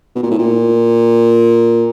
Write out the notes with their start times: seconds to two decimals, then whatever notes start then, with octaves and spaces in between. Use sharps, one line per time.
0.16 B2
0.23 A#2
0.31 A2
0.39 A#2